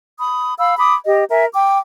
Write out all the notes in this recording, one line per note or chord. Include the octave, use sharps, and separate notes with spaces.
B5 D#6
F5 B5 E6
B5 D6 D#6
G4 D#5
A#4 E5 G#5
G5 D6